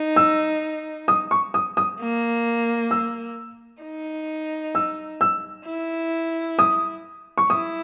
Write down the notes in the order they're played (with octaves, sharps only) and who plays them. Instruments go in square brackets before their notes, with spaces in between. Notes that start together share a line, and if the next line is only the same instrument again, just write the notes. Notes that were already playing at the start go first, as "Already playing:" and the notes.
Already playing: [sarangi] D#4
[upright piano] E6
D#6
C#6
D#6
D#6
[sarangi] A#3
[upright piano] E6
[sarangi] D#4
[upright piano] E6
E6
[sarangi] E4
[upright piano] D#6
C#6
[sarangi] E4 [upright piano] D#6